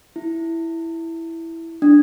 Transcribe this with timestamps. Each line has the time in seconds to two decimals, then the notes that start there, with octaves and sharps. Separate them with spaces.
0.16 E4
1.82 D4